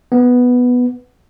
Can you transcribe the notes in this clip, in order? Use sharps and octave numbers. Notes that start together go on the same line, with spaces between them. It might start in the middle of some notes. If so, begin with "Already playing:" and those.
B3